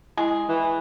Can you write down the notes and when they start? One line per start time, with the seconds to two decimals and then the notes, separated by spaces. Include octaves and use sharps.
0.17 G#3 E4 G#4
0.49 E3